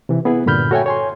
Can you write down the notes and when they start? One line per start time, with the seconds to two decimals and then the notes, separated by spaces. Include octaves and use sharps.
0.09 C3 E3
0.25 B3 E4 G#4 B4
0.46 G2 A#2 D3 B5 F6 G6
0.71 F#4 A4 C#5 E5 G5 G#5
0.86 C#5 G#5 C6